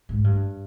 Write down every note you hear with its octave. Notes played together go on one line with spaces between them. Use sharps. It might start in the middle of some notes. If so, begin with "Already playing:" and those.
G#2
G2